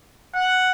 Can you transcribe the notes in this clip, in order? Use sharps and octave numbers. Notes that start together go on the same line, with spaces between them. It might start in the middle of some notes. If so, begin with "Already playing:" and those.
F#5